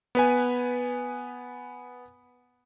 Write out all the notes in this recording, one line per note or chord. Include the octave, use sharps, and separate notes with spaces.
B3 B4 G#5